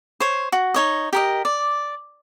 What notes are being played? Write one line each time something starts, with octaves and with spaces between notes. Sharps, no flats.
C5 C#5
F#4
D#4 C#5 D#5
G4 A#4 D#5
D5